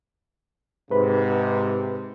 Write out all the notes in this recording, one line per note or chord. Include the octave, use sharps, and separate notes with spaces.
G#2 C3 B4 B5